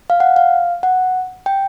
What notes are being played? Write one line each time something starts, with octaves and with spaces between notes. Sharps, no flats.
F5
F#5
F5
F#5
G5